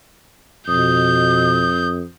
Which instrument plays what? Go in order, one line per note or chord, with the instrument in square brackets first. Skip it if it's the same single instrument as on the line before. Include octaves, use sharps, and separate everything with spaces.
[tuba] F2 [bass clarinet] B2 [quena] D#6 [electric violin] G6